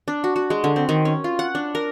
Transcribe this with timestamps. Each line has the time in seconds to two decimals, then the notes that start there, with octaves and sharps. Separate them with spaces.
0.08 D4
0.24 F#4
0.36 F#4
0.50 G#3
0.64 D3
0.76 C4
0.89 D#3
1.05 C#4
1.24 F4
1.39 F#5
1.55 D4
1.75 A#4